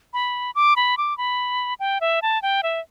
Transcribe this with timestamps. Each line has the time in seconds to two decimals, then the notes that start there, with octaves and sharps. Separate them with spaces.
0.13 B5
0.55 D6
0.76 B5
0.97 D6
1.18 B5
1.80 G5
2.01 E5
2.22 A5
2.42 G5
2.63 E5